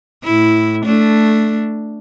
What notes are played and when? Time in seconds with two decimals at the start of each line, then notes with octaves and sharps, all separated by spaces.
0.24 A2 E4
0.85 A3 D4